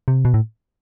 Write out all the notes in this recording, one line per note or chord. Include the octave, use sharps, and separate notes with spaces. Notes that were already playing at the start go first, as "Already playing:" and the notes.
C3
B2
A2